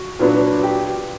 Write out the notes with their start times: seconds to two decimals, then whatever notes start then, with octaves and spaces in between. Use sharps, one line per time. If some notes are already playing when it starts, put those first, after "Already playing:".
Already playing: F#4
0.19 A#2 F#3 B3 D4
0.63 G4